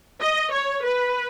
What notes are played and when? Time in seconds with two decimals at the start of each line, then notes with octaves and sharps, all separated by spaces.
0.21 D#5
0.52 C#5
0.83 B4